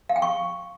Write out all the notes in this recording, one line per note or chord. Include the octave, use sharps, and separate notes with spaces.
F5
G5
C#6